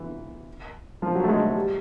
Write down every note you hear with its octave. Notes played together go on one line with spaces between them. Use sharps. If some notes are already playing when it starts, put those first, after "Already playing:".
Already playing: E3
F3
F#3
A3
G#3
G#3
G3